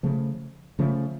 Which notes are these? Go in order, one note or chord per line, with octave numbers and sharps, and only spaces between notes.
C#3 F3 A3
C#3 F3 A3